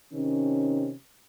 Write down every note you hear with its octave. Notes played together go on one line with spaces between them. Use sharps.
C3 D#3 C#4